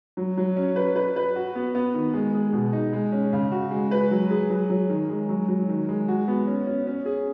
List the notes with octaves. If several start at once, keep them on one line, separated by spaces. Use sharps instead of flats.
F#3
F#3
C#4
B4
B4
B4
F#4
B3
B3
D#3
G#3
G#4
B2
D#4
G#3
C#4
C#3
F#4
G#3
B4
F#3
G#4
F#3
F#3
D#3
G#3
F#3
F#3
D#3
G#3
F#4
B3
C#4
C#4
C#4
G#4